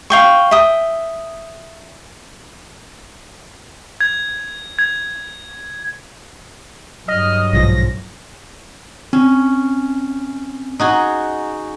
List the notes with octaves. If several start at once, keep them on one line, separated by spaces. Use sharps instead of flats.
F5 G5 C#6
E5 G5 D#6
G#6
G#6
G2 F#3 D#5 F6
B1 G#2 F3 A#6
C4 C#4
D#4 F#4 G#4